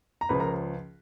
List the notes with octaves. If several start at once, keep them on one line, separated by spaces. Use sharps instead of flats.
A#5
C#2 C#3 F3 B4 B5
A#4 A#5